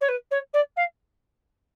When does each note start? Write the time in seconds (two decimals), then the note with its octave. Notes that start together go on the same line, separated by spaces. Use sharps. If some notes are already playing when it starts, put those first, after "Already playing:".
0.01 C#5
0.08 B4
0.31 C#5
0.53 D5
0.76 F5